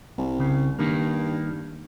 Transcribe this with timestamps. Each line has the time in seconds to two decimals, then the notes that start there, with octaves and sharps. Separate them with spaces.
0.18 C2
0.39 C#3
0.79 G2 D#3 A#3